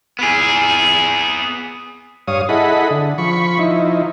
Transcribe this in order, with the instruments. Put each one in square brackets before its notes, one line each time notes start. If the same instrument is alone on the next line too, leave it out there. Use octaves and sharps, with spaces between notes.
[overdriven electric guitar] B3 G#4
[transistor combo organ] G2 C#5 F5 D#6
E4 G#4 A4 D#5 F#5 B5
D3
F3 B5 C#6
F3 D#4 E4